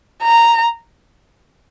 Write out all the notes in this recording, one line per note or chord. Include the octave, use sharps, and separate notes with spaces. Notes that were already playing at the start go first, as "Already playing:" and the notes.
A#5